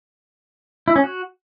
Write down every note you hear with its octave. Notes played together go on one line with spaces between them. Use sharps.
E4
C#4
F#4